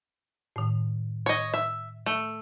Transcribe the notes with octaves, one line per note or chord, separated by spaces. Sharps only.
A2 D#3
C#5 D#5
E5
A3